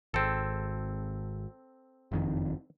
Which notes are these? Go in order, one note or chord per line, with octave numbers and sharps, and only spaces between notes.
G#1 C4 A4
F#1 F2 D#3